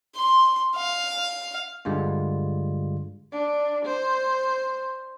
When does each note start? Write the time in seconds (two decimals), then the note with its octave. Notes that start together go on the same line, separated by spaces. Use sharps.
0.16 C6
0.76 F5
1.85 G2 D3 G3 G#3 F4
3.32 D4
3.85 C5